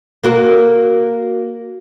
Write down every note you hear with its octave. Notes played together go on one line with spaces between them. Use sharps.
A#3 F#4 A#4